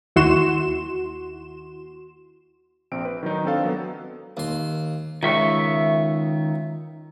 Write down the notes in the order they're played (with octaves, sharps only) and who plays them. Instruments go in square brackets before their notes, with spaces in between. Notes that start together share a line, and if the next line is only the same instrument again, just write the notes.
[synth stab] D#2 E4 F#4 C6 E7
[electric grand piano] A#1 C4 D7
B4
D#3 F#3 D#4
C4 D4 A4 F5
F#3 B3
[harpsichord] D#2 C6
[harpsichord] C#2 [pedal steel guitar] D#3 E5 C#6